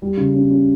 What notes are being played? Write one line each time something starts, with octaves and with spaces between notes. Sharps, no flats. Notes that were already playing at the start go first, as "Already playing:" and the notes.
G3
C#3
C#4
C#4